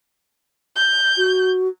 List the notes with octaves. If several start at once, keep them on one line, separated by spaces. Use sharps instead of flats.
G6
F#4